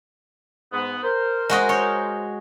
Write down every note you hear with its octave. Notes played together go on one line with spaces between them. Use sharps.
G#2 B3
A#4 C5
G#3 F#4 D#5
C#5